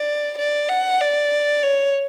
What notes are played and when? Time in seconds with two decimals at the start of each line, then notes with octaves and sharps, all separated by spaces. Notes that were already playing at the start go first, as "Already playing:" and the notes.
Already playing: D5
0.39 D5
0.69 F#5
1.01 D5
1.63 C#5